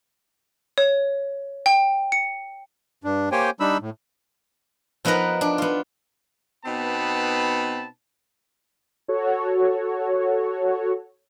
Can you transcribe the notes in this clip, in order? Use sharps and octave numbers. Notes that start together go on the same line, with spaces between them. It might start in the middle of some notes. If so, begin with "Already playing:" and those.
C#5
G5
C#7
G2 D4
A#3 G4 C5 C#5 G5 G#5
G3 D4 D#4 B5 E6
A2
F3 B3 D#4 A#4 B4 A#5
D4
B3 F4
B2 B3 C4 D#4 A5 B5
F#4 A4 C#5